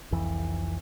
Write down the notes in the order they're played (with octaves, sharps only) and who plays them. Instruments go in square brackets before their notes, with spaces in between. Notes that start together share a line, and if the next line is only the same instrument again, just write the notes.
[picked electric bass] F1 C2 F2 E3